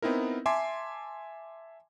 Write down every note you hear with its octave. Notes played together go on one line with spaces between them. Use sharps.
B3 C4 D#4 E4 A#4
E5 G#5 A5 C6 D6 C7